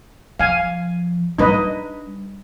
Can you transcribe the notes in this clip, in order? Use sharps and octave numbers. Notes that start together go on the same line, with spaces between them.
F3 F5 G#5
G3 D4 D#4 B4 D#5